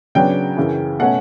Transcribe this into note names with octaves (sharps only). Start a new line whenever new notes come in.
C#3 F#3 B3 D4 G5
F#2 C#3 E3
B2 A3 C#4 F#5